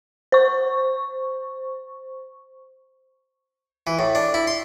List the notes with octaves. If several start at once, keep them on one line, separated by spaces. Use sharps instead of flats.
C5 C#6
E3
A2
D4
E4
C6